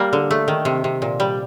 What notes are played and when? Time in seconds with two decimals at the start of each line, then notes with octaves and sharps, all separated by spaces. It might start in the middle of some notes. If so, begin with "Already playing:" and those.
Already playing: G3 A#3
0.13 D3
0.31 A3
0.48 D#3
0.65 C3
0.84 C3
1.02 A#2
1.20 G3